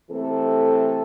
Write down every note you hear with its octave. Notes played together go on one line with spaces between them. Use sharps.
C3 E3 A3 C4 A4